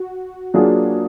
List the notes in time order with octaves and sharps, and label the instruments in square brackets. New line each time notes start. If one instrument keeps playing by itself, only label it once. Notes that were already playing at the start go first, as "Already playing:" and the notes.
Already playing: [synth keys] F#4
[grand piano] F#3 A#3 D4 F4 G#4